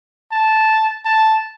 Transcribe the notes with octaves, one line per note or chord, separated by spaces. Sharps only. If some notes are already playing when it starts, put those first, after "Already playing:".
A5
A5